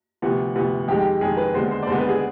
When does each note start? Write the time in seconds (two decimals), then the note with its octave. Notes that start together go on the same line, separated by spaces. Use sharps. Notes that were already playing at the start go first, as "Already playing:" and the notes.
0.22 D2 C3 F3 B3
0.55 D2 C3 F3 B3
0.88 F2 D#3 G#3 G4
0.99 G4
1.21 F2 D#3 G#3 G#4
1.37 B4
1.54 D#2 D3 G#3 B3 C5
1.71 C5
1.83 D5
1.87 D#2 D3 G#3 B3 C5
1.99 B4
2.09 G#4